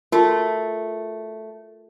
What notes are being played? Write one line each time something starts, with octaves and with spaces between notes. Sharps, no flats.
A3 F4 F#4 A#4